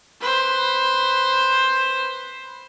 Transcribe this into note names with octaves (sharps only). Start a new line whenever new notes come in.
B4 C5